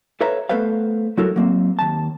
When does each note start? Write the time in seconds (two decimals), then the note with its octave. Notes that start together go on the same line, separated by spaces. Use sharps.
0.21 A4 B4 C#5 E5 F5 A#5
0.49 A3 B3 A4 B4 C5 F5
1.18 F#3 G3 E4 F#4 A4 A#4
1.36 F#3 A#3 C4
1.79 D#2 A5